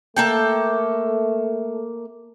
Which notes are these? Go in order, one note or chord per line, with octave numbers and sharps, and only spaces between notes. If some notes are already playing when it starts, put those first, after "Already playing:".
A3 A#3 A4 G5